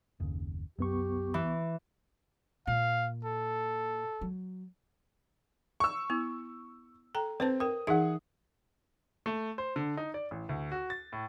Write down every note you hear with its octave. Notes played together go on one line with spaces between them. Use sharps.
F#1 D#2 C#3
C2 F#2 B3 G4 C#6
E3
A#2 F5
A4
F#3
C#6 E6
B3 E4
A4 G5 A#5
C4 B4 C5 A5
A#4 G5 D#6
E3 D#4 G#4 E5 F#5
A3
C5
D3
D#4
D5
A1
D2
F#4
A6
A2